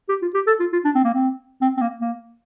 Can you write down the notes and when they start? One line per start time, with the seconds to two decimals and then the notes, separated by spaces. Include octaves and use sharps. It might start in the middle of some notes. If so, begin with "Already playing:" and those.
0.09 G4
0.22 F4
0.34 G4
0.47 A4
0.60 F4
0.73 F4
0.85 D4
0.95 C4
1.04 A#3
1.14 C4
1.62 C4
1.77 C4
1.81 A#3
2.00 A#3